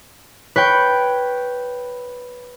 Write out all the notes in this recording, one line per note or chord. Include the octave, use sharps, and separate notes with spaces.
B4 C#5 G5